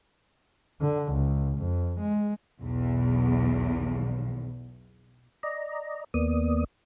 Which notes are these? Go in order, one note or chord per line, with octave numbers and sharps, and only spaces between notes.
D3
C#2
F2
G#3
B1 E2
D5 D#5 A#5
D#2 A#3 B3 D5 D#6